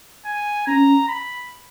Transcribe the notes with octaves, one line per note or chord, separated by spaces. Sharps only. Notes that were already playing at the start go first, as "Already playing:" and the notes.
G#5
C#4 A#5
B5